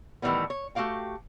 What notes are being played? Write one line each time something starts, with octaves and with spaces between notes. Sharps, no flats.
A2 D#3 E3 F#3 G3 B3
C#5
A3 F#4 G4 F5 G5